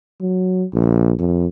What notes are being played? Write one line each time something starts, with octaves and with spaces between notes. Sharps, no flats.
F#3
A#1
F2